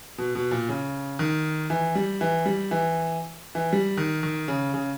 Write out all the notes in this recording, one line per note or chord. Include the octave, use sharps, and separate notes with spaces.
B2
B2
A#2
C#3
D#3
E3
G3
E3
G3
E3
E3
G3
D#3
D#3
C#3
C#3